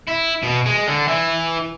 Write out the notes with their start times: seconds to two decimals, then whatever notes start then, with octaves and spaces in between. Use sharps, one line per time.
0.07 E4
0.43 B2
0.66 G#3
0.87 D3
1.08 E3